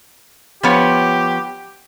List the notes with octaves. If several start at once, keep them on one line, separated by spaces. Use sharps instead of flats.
F3 B3 G4 C#5